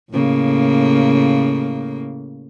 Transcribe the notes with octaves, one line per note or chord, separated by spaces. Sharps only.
A2 C#3 A#3